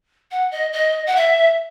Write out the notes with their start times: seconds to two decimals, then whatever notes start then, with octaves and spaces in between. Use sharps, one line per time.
0.31 F#5
0.51 D#5
0.73 D#5
1.07 F#5
1.16 E5